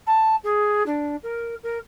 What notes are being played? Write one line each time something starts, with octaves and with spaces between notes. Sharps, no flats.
A5
G#4
D4
A#4
A#4